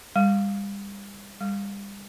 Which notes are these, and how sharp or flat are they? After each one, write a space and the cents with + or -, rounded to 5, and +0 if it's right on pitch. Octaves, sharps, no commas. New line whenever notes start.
G3 +35
G3 +35